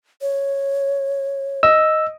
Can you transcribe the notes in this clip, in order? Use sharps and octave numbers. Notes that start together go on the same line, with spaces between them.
C#5
D#5 E6